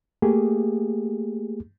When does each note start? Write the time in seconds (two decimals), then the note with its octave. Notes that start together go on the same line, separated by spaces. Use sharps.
0.22 A3 A#3 G4 G#4